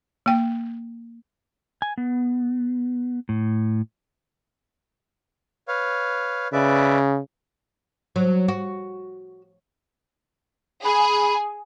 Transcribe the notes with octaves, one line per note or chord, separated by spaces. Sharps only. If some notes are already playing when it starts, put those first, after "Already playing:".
A#3 G5
G#5
B3
A2
B4 C#5 F5
C#3 B4 D5 E5
F#3
F#4
G#4 B5